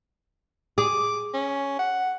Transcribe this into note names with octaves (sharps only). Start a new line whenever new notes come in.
G#4 D6
C#4
F#5